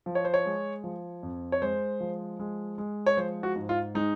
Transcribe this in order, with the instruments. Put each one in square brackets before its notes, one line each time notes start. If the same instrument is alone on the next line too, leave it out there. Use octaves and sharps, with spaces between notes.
[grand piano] F3
C#5
C5
C#5
G#3
F3
F2
C#5
G#3 C5
F3
G#3
G#3
C#5
F3 C5
F#4
G#2
F4
G#3 D#4